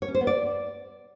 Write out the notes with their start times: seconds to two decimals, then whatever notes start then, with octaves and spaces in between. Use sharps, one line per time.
0.02 C#5
0.08 C#4
0.15 C5
0.21 B3
0.27 D5